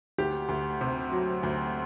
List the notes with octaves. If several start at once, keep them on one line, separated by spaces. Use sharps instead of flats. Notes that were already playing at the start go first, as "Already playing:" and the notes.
D2 G4
D2
C3
F#3
D2